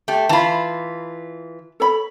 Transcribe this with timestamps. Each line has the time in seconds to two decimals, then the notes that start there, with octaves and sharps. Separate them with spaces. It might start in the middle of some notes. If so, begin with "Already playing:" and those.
0.08 A3 G4
0.29 E3 F4 A5 B5
1.80 A4 C#5 B5